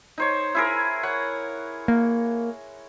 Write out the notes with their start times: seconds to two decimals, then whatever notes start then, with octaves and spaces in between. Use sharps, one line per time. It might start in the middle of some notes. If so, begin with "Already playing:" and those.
0.18 D#4 C5 C#5
0.55 E4 G#4 A#4
1.03 C#5 F#5
1.88 A#3